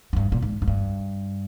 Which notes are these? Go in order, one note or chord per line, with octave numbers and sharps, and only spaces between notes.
G#2
G2
A#2
G#2
G#2
G2